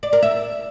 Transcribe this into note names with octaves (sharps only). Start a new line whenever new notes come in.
D5
A#4
E5